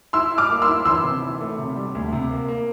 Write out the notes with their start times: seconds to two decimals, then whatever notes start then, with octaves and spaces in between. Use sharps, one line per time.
0.13 E4 C6 E6
0.32 E4
0.38 D6 F6
0.50 A#3
0.62 C6 E6
0.68 E4
0.85 E3 C6 E6
1.04 C3
1.22 E3
1.41 A3
1.58 C3
1.76 G3
1.95 D2
2.12 C3
2.31 A#3
2.48 A#3